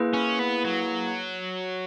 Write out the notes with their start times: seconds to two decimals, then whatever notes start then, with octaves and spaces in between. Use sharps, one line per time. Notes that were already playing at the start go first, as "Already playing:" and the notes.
Already playing: A#3 E4 G#4 B4
0.14 C#4
0.39 B3
0.64 F#3